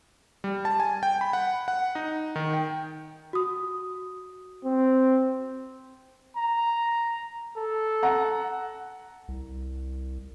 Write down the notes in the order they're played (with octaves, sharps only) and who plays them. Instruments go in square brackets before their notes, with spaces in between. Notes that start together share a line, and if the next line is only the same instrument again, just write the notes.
[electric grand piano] G3
A5
G#5
G5
B5
F#5
F#5
D#4
D#3
G5
[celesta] F#4 D#6
[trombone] C4
[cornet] A#5
A4
[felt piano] F#5 A#5
[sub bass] C2